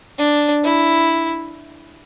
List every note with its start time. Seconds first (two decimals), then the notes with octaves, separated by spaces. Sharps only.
0.18 D4
0.64 E4